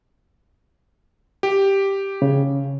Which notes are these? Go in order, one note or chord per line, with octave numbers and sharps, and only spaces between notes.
G4
C#3